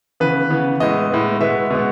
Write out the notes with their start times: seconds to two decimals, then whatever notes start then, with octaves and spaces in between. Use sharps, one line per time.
0.20 C#3 E3 B3 B4
0.50 C#3 E3 B3
0.80 A2 G#3 B3 D#5
1.11 A2 G#3 B3
1.40 B2 G#3 B3 E5
1.70 B2 G#3 B3